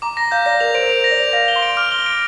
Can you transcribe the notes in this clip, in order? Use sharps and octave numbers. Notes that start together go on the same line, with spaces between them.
A#5 D6
A#5 A#6
F5 G6
D5 A#6
A#4 F7
C5 D7
A#4
C5 F7
A#6
D5
F7
F5 A#6
G7
C6
D7
D6 F6
G7
D7